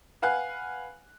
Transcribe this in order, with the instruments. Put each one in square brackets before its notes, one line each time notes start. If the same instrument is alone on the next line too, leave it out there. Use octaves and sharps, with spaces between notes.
[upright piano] B4 F5 F#5 G#5 F#6